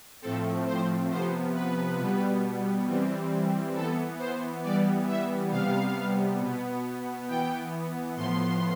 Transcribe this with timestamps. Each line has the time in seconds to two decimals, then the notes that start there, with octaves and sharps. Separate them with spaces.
0.22 A2 F3 A3 C4 A4
0.67 C5
1.10 C3 F3 B3 C5
1.55 B4
1.99 B2 G3 B3
2.87 E3 G3 C4
3.75 E3 B3 A4
4.19 C5
4.63 E3 G3 B3 D5
5.08 E5
5.52 C3 G3 B3 F5
6.40 B2 B3
7.28 E3 B3 G5
8.16 A2 F3 B3 C6